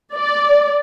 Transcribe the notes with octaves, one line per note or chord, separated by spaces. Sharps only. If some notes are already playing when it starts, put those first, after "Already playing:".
D5